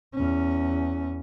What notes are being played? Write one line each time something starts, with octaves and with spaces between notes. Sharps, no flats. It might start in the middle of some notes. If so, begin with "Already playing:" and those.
E2 C#4